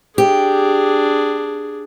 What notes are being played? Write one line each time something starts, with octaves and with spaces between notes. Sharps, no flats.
D4 G4 G#4